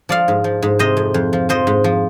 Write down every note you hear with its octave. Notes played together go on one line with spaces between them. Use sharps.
F3 D5 F5
G#2
F3
G#2
C3 C5 D#5
F2
F2
F3
F3 C5 D#5
G#2
F3